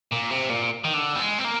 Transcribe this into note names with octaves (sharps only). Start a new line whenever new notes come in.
A#2
C3
A#2
D#3
D3
G3
G#3
C4
A#3